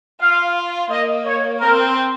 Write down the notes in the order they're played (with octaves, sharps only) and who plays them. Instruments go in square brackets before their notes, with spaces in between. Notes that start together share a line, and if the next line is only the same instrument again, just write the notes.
[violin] F4 [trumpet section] F5
[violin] A#3 [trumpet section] D#5
[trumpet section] C#5
[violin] C4 [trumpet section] A#4